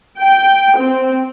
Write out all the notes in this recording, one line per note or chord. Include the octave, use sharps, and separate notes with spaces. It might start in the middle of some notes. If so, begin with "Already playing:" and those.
G5
C4